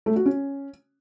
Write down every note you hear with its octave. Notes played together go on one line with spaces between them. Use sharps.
A3
F#4
C#4